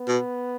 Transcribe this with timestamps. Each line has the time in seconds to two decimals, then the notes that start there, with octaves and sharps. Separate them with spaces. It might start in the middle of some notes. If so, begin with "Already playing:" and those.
Already playing: B3
0.08 B2